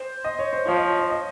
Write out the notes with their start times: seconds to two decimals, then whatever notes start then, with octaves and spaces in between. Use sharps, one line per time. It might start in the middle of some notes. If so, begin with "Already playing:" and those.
Already playing: C5
0.24 D#5
0.39 C#5
0.53 C5
0.67 F3 C#5
0.78 D#5
0.99 C#5
1.10 D#5